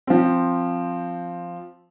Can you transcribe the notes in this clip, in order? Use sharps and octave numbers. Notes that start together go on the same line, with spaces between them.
F3 C4